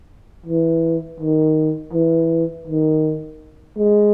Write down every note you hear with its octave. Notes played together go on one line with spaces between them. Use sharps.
E3
D#3
E3
D#3
G#3